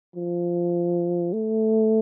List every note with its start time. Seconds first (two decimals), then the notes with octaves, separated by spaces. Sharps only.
0.16 F3
1.33 A3